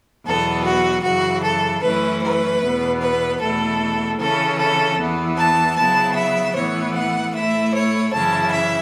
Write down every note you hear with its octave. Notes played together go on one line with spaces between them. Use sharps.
E2 B2 F#3 B3 A4
F#4
F#2 C#3 E3 F#4
A4
F#2 E3 A3 C#4 E4 B4
B4
E2 B2 B3
B4
E2 B2 A3 E4 A4
C#3 E3 C#4 E4 A4
A4
E2 E3 B3
A5
C#3 F#3 B3 E4 A5
E5
A2 E3 B3 C#5
F#5
A2 A3 E4 E5
C#5
F#2 C#3 E3 C#4 E4 A5
E5